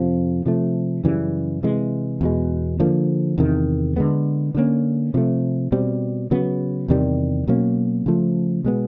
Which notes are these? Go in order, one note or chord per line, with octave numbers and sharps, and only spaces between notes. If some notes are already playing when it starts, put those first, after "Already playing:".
Already playing: F2 C3 F3
C3 F3 A3
F#2 C#3 E3 G3
C3 E3 G#3
E2 B2 G#3
D3 F3 A#3
E2 C3 D#3
D3 F3 G#3 B3
D3 F3 A#3 C#4
C3 F3 A3
B2 G3 C4
C#3 F#3 B3
E2 C3 D#3 G3
B2 F#3 A#3 C#4
C#3 F3 A3
B2 G#3 B3